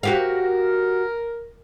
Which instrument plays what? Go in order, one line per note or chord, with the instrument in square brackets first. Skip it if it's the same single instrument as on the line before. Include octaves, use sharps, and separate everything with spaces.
[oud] F#4 G4 F5 [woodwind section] A#4